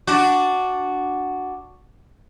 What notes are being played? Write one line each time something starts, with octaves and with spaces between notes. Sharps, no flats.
D4 F#4